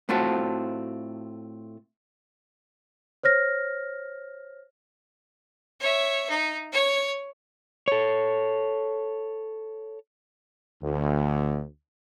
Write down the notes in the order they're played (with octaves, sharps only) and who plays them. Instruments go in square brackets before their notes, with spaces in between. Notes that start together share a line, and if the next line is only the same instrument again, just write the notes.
[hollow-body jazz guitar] A2 A3 C4 F4 F#4 A5
[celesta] C5 C#5 F6 A#6
[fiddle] C#5 E5
D#4
C#5
[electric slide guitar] A4 C#5
[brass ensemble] D2